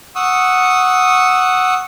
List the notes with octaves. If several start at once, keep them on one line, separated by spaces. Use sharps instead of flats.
F#5 C#6 D#6 E6